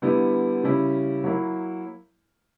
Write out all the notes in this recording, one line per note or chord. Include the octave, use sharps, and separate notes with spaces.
D3 G3 B3 E4
C#3 G3 C#4 E4
F#3 A#3 E4